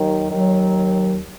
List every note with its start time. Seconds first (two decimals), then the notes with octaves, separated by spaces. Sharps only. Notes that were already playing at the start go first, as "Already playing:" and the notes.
Already playing: D#2 D#3 F#3
0.32 D#2 D#3 F#3